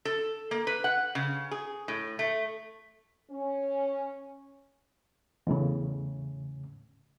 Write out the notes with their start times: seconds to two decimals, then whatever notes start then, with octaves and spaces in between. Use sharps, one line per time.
0.05 A4
0.51 A#3
0.67 B4
0.84 F#5
1.15 C#3
1.51 G#4
1.88 A2
2.19 A3
3.30 C#4
5.47 E2 A2 C#3